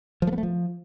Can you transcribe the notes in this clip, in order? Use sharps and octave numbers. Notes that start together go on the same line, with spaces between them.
F3
A3
B3
A3
F3